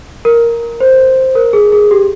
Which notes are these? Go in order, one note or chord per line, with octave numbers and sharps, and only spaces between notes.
A#4
C5
A#4
G#4
G#4
G4